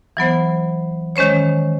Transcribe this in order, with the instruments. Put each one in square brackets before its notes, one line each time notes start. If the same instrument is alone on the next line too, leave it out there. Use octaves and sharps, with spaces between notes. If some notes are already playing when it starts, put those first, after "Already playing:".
[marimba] E3 F#3 B3 C5
D#3 G#3 C#4 C5 C#5